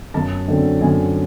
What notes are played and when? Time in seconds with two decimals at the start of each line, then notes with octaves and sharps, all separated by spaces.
0.14 F#2 A5
0.48 D3 F#3 A3 C4
0.81 F#2 G#5